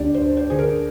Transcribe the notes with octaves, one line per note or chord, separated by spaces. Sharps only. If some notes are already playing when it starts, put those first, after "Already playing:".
Already playing: D2 D3 G#3 D4 G4 D5
C5
D2
C5
D3 G#4
A#4